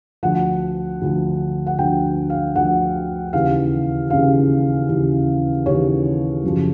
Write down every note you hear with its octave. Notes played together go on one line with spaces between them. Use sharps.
D2 D3 F3 F#5
D2 D3 F3
F#5
D2 D3 F3 G5
F5
D2 D3 F3 F#5
D#2 C#3 E3 F5
D#2 C#3 E3 F5
D#2 C#3 E3
D#2 C#3 E3 C#5
F#2 C#3 F3